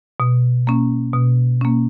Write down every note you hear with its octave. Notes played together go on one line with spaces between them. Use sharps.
B2
A#3 C#4
B2
A#3 C#4